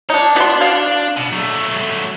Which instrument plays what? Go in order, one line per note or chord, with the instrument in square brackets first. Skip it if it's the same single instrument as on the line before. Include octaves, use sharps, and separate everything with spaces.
[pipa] D4 D#4 [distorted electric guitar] C#5
[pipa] B2 C6 [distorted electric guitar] D4
[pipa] F5
[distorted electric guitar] B2
F#3 A3